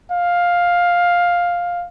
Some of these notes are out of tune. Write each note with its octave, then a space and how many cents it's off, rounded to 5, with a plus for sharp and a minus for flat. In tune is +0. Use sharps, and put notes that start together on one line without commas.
F5 +10